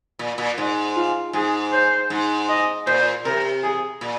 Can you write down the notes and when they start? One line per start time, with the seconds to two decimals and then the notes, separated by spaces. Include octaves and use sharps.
0.19 A#2
0.38 A#2
0.58 G#2
0.96 F4
1.33 G#2 G#4
1.72 C5
2.10 G#2
2.49 D#5
2.87 A#2 C5
3.25 C3 A#4
3.63 G#4
4.01 A#2